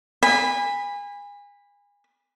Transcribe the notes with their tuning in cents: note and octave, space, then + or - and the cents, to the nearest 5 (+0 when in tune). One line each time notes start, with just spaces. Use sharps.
G#5 -30 B5 +0